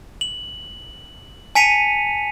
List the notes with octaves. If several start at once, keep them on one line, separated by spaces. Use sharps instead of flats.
F#7
G#5 A5 B6 C#7 D#7 F7